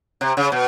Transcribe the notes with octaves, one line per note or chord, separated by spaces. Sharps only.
C3
C#3
B2